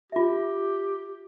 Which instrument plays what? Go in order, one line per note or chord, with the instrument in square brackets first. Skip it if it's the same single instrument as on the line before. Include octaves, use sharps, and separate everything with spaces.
[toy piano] F4 E5 [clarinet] G4